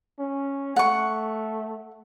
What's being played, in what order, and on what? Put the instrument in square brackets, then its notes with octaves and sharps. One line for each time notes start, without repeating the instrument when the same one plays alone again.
[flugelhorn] C#4
[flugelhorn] A3 [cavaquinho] F#5 C#6